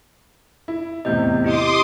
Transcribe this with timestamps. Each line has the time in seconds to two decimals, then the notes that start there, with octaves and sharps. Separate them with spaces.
0.68 E4
1.05 E2 A2 C3 D#5 G6
1.44 E4 G4 D#5 C6 D6 D#6